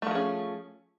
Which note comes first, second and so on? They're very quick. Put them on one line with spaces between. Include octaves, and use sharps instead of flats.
A3 F3 G#4 C#4